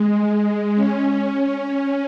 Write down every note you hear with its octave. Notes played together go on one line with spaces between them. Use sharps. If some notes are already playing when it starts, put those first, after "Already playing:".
Already playing: G#3
C#4